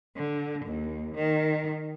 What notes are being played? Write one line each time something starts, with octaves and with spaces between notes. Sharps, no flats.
D3
D#2
D#3